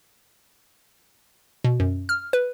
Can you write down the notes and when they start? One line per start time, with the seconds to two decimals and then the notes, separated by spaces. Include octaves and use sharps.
1.64 B2
1.80 F#2
2.09 F6
2.33 B4